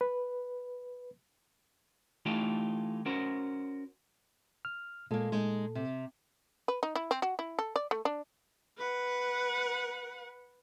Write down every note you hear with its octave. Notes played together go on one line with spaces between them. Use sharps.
B4
E3 A3 D#4 F4 G4 A4
C#4 F#4 A#4 C5
F6
A#2 G#3 A#3 A4
G#3 D#4
C3
B4
D#4
E4
C4
F#4
E4
A4
D5
A3
D4
B4 F#5